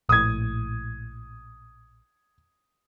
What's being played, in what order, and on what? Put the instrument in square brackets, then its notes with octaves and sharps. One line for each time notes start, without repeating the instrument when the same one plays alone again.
[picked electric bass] A#1 A2 [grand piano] D#6 G#6